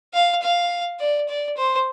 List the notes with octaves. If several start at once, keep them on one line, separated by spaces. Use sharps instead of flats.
F5
F5
D5
D5
C5